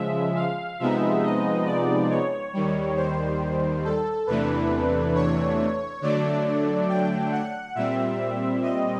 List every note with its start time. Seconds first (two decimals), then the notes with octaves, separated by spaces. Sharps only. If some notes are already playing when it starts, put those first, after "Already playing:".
Already playing: C#3 F3 G#3 E5
0.36 F5
0.79 C3 F3 G#3 B3 D#4 E5
1.23 D#5
1.66 D5
2.10 C#5
2.53 D#2 D#3 G3
2.96 C5
3.84 A4
4.27 E2 C3 E3 A3 D4 B4
5.15 C#5
6.01 D3 F#3 A3 D4 D5
6.89 G5
7.32 F#5
7.75 A#2 G3 C4 E5
8.63 D#5